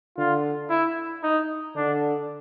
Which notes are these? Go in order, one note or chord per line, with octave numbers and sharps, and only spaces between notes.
D3 F4
E4
D#4
D3 D4